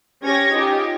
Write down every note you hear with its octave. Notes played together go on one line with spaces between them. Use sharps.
C#4 G4 C#5 G#6 A#6
D#4 F4 G4